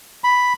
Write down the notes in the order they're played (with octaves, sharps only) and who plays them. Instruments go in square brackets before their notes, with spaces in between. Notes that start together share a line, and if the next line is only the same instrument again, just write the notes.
[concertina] B5